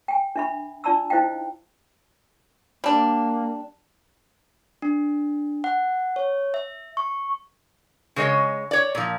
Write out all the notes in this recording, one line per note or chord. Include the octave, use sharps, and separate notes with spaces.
G5 G#5
D4 E5 B5
D4 F4 D5 A5 B5 E6
D#4 E4 C5 D#5 F5 G5
G3 A#3 D4
D4
F#5
C#5
E5
C#6
C#3 G#3 C#5 D#5
C#5 D5
A#2 F3